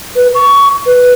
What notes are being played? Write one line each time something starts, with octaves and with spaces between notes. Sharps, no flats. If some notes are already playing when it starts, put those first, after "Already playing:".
B4
C#6
B4